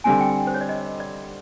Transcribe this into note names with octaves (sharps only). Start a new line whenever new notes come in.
D3 G3 C4 G#5
G5
C5
C#5
D5
D#5
D5